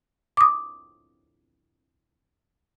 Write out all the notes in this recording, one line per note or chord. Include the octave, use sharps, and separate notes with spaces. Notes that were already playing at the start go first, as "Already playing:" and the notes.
D6 D#6